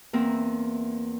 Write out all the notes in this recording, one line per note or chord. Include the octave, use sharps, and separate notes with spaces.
E2 A#3 C4 A#4 E5